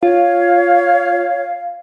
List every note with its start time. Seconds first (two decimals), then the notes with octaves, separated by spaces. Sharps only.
0.03 F4 C#5 F5